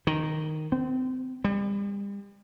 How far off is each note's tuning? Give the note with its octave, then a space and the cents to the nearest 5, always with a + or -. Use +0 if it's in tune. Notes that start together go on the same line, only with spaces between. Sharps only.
D#3 -5
C4 -30
G3 +40